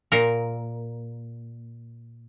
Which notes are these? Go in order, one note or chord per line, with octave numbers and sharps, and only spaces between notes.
A#2 A#4